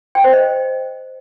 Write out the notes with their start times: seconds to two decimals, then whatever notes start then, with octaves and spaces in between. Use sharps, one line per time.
0.15 G5
0.24 C5
0.33 D#5